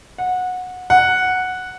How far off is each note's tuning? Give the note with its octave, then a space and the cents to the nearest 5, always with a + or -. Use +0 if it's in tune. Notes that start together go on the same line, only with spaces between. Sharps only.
F#5 -20
F#5 -5